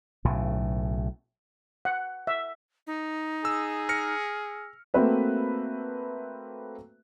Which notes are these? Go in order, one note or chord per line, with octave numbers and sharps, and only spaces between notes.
B1 A2 C#3
F#5
E5
D#4
G#4 E6
F6 A#6 C#7
A3 A#3 C4 F#4 B4 E5